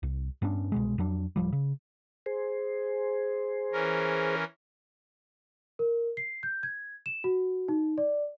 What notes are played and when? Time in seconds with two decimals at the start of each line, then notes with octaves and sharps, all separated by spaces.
0.03 C2
0.42 G2 B3 C#4 D4
0.72 C2 B2 G#3
0.98 F2 F#3 D4
1.36 D1 D2 F3 G3
1.52 C#3
2.26 G#4 C5
3.72 E3 C#4 A#4
5.79 A#4
6.17 C7
6.43 G6
6.63 G#6
7.06 E7
7.24 F#4
7.68 D#4
7.98 D5